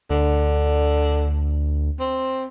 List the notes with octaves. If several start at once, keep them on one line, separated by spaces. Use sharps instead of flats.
D2 D3
C4